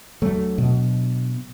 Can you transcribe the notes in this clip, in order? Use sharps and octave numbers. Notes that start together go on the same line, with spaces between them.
F#3 A3 D4
B2